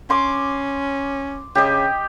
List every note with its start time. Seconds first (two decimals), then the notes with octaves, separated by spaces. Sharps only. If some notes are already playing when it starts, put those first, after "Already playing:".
0.10 C#4 C6 D6
1.55 C#3 G4 D#5